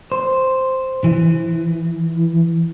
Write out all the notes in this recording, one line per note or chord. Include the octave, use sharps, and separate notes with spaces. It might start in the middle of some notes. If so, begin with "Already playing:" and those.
C5
E3